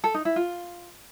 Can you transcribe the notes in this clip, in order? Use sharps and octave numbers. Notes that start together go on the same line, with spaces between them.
A4
D#4
E4
F4